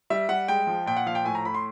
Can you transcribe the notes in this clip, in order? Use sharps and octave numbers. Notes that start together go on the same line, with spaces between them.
G3 E5
G3 F#5
G#3 G5
F3
A#2 G5
F#5
F3 F5
G5
A2 G#5
A#5
A2 B5
C6